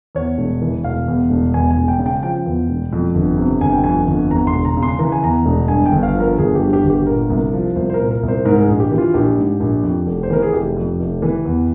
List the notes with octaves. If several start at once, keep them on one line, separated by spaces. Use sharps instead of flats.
E2 C#5
E1
E3
E1 F5
E2
E1
E2 G#5
G#5
E1
G5
C#3
G5
F3 G5
E2
E1
F2
G1
C3
G1 G#5
G5
F2 G#5
G1
E2 A#5
C6
E1
A#5
C#3
C6
E3 A#5
G#5
E2 A#5
E1
G2 G#5
G5
G1
F5
F3
A#4
G1 G#4
G4
G2
G4
G1
G4
A#2 A#4
C2
F3
C2 C5
C5
A#4
A#2
A#4
C2
C5
G#2 A#4
A#4
G#4
A#1
G4
E3
F4
A#1 G4
G#2
A#1
F2
F1
C5
E3 A#4
G#4
F1 G4
F2
F1
E3
E2